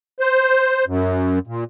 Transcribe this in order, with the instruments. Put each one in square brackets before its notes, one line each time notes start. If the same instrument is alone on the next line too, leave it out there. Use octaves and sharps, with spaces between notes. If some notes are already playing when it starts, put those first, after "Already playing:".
[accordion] C5
F#2
A#2